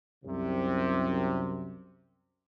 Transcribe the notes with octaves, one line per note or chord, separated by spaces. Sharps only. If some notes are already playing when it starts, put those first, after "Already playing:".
C2 F#2 C3